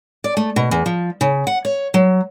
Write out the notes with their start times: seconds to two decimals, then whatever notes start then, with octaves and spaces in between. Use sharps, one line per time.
0.24 D5
0.37 A3
0.56 B2
0.71 E2
0.86 F3
1.21 C#3
1.47 F#5
1.65 C#5
1.94 F#3